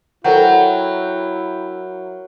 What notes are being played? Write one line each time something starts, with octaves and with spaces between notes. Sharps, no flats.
F#3 E4 A4 A#4 C5 C#5 F#5 G5